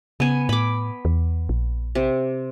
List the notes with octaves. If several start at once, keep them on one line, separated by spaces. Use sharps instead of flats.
C#3 B3 G#5
A2 B5 D6
E2
A#1
C3